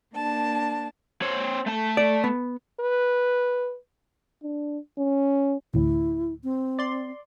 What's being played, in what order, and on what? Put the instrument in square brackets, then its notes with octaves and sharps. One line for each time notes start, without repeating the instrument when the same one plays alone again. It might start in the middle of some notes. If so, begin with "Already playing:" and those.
[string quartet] A#3 D4 A5
[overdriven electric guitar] C4 C#5
A3 A5
[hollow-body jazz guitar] D5
B3
[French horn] B4
[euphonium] D4
C#4
[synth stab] A1 D2 A2 [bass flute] E4
[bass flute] C4
[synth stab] D5 C6